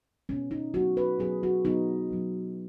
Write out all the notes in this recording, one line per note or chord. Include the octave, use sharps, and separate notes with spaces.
B2 G#3 B3 C#4
D#4
B2 F#3 B3 F#4
B4
B2 F#3 B3 G#4
F#4
B2 F#3 B3 D#4
B2 F#3 B3